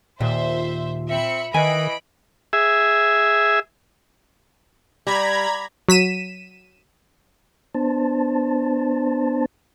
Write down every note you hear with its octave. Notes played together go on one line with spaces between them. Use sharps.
D#2 A#2 C5 E5
C4 E5 B5 C#7
D#3 E3 D#5 G#5 B5 D7
G#4 E5
G3 A#5 B5 G#6
F#3 B6 D#7 E7
B3 D4 C5 A5